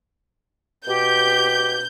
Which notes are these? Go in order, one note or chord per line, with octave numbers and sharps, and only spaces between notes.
B2 G4 G6